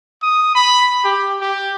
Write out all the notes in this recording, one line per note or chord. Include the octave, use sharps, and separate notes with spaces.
D#6
B5
G4
G4